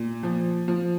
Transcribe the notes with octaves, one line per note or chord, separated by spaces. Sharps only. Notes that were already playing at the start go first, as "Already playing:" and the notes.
Already playing: A#2
F3
F3